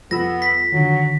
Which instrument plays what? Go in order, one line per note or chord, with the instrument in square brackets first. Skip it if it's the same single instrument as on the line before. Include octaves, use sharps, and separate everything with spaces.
[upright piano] F2 [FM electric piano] G3 B5 E6 [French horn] B3 [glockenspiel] A#6
[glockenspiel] B6
[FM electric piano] D3 D#3 [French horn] F#3